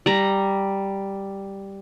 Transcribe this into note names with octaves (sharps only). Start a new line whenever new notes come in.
G3 A#5